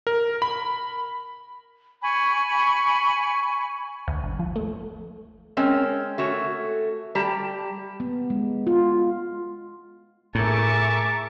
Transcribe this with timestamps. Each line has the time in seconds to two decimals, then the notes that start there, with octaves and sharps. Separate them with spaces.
0.07 A#4
0.42 B5
2.03 G#5 B5 C#6
4.08 D2
4.24 G1
4.39 F3
4.56 A3
5.57 G#3 C4 C#4 A#4
6.18 A3 F#4 C#5
7.15 G3 G4 A5 A#5
8.00 B3
8.30 G#3
8.67 F4
10.35 A2 G#4 A#4 E5 A5 C#6 D6